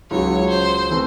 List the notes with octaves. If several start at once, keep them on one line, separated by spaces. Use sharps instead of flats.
C#2 C#3 F#3 C#5
C5
E3 A3 C4